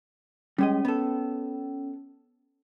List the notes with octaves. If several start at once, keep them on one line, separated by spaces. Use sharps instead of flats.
G3 G#3 C#4 D#5
B3 A4